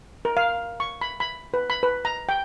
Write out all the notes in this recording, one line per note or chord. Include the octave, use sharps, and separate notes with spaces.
A#4
F5
C#6
B5
B5
B4
B5
B4
A#5
G5